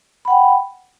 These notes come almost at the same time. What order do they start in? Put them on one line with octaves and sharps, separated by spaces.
B5 F#5 G5